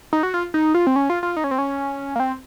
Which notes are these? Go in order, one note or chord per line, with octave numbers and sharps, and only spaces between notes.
D#4
F#4
F4
D#4
F4
C4
C#4
F4
F4
D#4
C#4
C4
C#4
A#3
C4